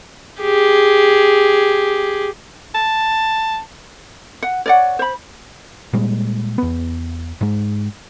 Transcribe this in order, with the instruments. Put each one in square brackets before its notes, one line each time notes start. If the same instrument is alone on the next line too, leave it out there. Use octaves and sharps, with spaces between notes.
[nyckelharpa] G4 G#4
[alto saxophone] A5
[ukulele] F#5
C#5 D5 F#5
C5 B5
[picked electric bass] A#2 G3 G#3
E2 B3
G#2 G#3